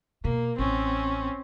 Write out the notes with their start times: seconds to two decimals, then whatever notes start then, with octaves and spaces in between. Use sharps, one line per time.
0.25 B2 A#3
0.59 A1 C4 C#4